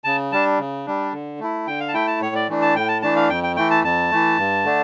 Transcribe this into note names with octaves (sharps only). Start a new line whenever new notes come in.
C#3 A5
G3 D4 A5
C#3
G3 D4
D3
A3 E4
D3 G5
F5
A5
A3 E4 G5
A5
A2 C#5
D5
E3 A3 D4
A5
A2 G5
A5
E3 A3 D4 A5
F5
F2 G5
G5
E3 A3 G5
A5
F2 A5
E3 A3
G2
D3 A3 D4